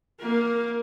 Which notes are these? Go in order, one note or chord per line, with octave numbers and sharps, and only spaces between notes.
A#3 A#4